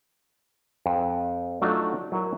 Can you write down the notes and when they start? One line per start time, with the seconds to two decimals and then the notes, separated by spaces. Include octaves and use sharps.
0.86 F2
1.62 F#3 A3 D4 D#4 F4 F#4
2.12 F#3 E4 F#4 A#4